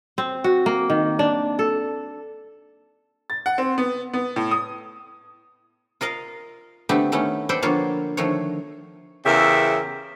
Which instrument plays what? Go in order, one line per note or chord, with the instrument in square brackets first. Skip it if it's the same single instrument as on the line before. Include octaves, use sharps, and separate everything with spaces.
[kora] C4
F#4
A#3
D#3
D4
A4
[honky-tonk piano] A6
F#5
C4
B3
B3
A2
D#6
[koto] F4 A#4 D#5 F5
D3 A3 B3 C4 G4
D#3 A3 B3 C#4
A4 B4 C5 D5 G5
D3 F3 A#3 B3 F4 C#5
D3 D#3 F3 A3 C#5
[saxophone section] E2 C#3 G4 A#4 E5